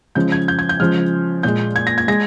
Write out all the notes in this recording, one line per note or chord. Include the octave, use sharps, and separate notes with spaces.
C#3 F3 G#3 G6
G#6
G6
G#6
G6
C#3 F3 G#3 F6
A#2 G#3 G6
G#6
A#6
G#6
G#3 A#6